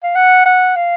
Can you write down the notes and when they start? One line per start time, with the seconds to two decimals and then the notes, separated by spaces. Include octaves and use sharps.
0.03 F5
0.15 F#5
0.45 F#5
0.76 F5